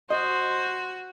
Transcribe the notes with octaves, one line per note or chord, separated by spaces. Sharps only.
F#4 C5 D#5